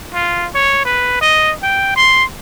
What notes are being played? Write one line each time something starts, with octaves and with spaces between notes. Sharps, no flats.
F4
C#5
B4
D#5
G5
C6